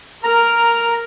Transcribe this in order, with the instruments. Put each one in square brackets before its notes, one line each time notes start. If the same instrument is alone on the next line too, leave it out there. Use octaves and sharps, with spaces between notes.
[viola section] A#4 [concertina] A#5